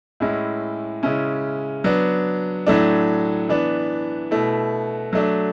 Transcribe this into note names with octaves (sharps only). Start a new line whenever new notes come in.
A2 G#3 C#4 E4
C#3 G#3 C#4 E4
F#3 B3 D4
A2 F#3 A3 D4
E3 B3 D4
B2 A3 E4
F#3 A3 D4